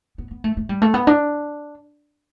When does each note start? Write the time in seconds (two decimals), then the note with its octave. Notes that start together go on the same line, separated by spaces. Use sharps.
0.18 B3
0.31 B3
0.44 A3
0.57 A3
0.69 G3
0.82 A3
0.94 B3
1.07 D4